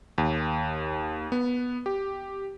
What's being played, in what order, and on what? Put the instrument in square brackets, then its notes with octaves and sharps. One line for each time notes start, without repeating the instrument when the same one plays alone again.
[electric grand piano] D#2
B3
G4